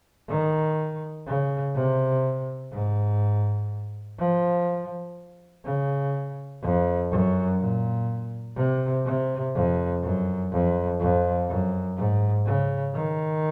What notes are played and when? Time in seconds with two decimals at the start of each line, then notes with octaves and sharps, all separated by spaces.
0.29 D#3
1.27 C#3
1.75 C3
2.72 G#2
4.19 F3
5.65 C#3
6.62 F2
7.11 F#2
7.59 A#2
8.56 C3
9.05 C3
9.55 F2
10.03 F#2
10.52 F2
11.00 F2
11.49 F#2
11.97 G#2
12.46 C#3
12.94 D#3